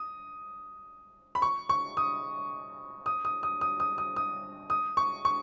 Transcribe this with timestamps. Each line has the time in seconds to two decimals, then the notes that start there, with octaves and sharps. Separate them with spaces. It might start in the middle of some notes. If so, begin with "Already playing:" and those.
Already playing: D#6
1.35 B5
1.42 C#6
1.69 C#6
1.97 D#6
3.06 D#6
3.25 D#6
3.43 D#6
3.61 D#6
3.80 D#6
3.98 D#6
4.16 D#6
4.70 D#6
4.97 C#6
5.25 C#6